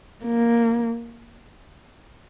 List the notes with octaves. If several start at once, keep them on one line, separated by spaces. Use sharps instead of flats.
A#3